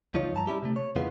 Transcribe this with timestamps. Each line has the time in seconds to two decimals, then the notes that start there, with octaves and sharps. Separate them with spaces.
0.14 C#2 F3 D#4 F4 C#5
0.34 G2 A5 A#5
0.47 G3 C#4 E4 G4
0.63 C3 A3
0.76 C#5
0.96 F2 C#3 E3 G#3 B3 F4